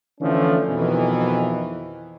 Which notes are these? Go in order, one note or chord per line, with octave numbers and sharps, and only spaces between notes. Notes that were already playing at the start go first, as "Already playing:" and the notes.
D3 E3 F3 A3 C#4
F2 B2 D#3 E3